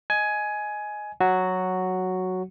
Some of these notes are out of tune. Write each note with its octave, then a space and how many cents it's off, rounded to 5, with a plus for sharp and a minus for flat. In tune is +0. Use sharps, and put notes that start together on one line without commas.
D#5 +0 G#5 +15
F#3 +0 F#4 +0